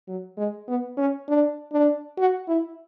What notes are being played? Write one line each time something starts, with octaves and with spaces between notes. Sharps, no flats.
F#3
G#3
B3
C#4
D4
D4
F#4
E4